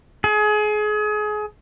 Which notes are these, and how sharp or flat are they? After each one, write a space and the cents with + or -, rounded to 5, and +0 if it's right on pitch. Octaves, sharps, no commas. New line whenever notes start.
G#4 +30